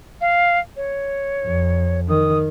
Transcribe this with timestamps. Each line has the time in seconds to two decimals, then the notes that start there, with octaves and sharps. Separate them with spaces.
0.21 F5
0.77 C#5
1.45 F2
2.09 D#3 D#6